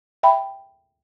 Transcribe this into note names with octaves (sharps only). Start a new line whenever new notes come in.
E5 G5 B5